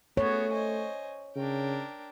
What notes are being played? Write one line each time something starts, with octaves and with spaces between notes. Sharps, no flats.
A3 B3 F#4 G#4 C#5
C5 D#5 G#5
C#3 D4 A#4 G5